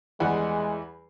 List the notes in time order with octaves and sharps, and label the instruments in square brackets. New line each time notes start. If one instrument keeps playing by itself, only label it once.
[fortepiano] E2 G3 F#5 [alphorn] G#3